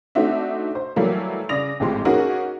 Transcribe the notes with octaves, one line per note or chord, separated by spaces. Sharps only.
A3 C4 D4 D#4 F#4 E5
C5
E3 F#3 G3 A3 A#3 E4
C#3 D5 D#6 A#6 F7
G#1 A2 F3 G#3 G4 C6
A#3 C#4 D#4 F#4 G#4 A#4